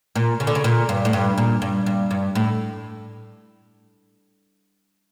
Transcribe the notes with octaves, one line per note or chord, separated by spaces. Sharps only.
A#2
C#3
D3
C#3
A#2
G2
A2
G2
A#2
G2
G2
G2
A2